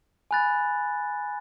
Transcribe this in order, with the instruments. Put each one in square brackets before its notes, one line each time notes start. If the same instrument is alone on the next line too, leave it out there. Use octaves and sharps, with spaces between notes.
[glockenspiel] G#5 B5 F#6 A6